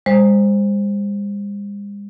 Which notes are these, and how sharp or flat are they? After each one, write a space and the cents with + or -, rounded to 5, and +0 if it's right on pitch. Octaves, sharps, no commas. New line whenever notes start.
G#3 -45 C5 +0